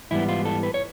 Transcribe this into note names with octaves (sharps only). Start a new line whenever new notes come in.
G#2 E3 G3 B3 E4
F4
A4
B4
C#5